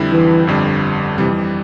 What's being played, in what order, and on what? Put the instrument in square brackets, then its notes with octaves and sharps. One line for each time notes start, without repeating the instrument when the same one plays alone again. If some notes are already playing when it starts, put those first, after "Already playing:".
Already playing: [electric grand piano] F2 D3 G3 C4 E4
[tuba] E3
[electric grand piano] G1 F2 D3 G3
[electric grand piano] F2 E3 G3 [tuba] C3